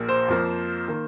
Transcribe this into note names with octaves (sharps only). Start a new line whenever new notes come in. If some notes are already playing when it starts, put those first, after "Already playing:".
Already playing: A#1 A#2 A#3
C5
F2 F3 A#3
D#3 A#3